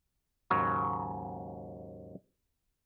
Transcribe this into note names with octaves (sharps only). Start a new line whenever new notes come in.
D#2 G#2 C#3 F#3